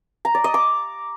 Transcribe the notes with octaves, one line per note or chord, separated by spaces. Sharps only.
A#5
D5
D#5
D6